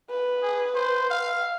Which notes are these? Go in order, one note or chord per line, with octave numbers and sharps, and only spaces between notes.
B4
G#4
C5
F5